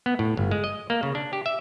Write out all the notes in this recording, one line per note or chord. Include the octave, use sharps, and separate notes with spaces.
B3
A2
G1
G#3
D#5
A#3
C#3
D4
G4
E5